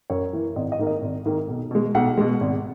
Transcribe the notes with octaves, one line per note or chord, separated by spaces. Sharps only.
F#2 C#5
E3 A#3
G#1 D#5
D#5
G#2 D#3 A#3
D#5
G#1
G#2 D#3 A#3
B1
B2 G#3
B1 F#5
B2 G#3
G#1